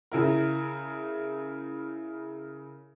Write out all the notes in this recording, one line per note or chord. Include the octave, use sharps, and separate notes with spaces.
C#3 E4 A#4